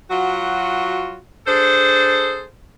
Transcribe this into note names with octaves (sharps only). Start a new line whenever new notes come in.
F#3 F4 F#4
D4 G#4 A4 C5